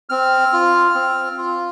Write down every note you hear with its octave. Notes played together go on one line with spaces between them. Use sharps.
C4 F6
F4
C4
F4